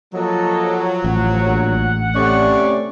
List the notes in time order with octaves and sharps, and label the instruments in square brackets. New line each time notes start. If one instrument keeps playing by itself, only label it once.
[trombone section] F3 [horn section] F#3 [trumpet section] A#3 A4 D#5
[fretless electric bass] A1 [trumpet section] F#5
[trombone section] A#1
[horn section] C3 C#5 D5 [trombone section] A3 C#4